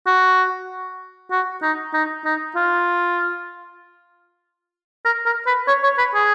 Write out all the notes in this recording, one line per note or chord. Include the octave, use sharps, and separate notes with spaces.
F#4
F#4
D#4
D#4
D#4
F4
A#4
A#4
B4
C#5
C#5
B4
G#4